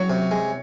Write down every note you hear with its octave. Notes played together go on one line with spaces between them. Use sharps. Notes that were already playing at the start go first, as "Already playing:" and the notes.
Already playing: F#3 C#5
C3
G#3